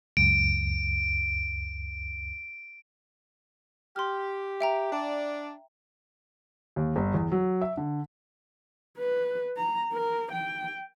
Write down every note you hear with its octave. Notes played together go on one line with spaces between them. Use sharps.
C#2 F#2 D7
G4 C6 F6
E5 G5 A#5
D4 D5
D#2
G1
E2
F#3
E5
D3
B4
A#5
A#4
G5